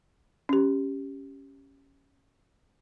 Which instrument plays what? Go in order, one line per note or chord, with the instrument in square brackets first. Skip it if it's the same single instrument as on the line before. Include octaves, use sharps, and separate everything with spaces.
[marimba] C#4 G4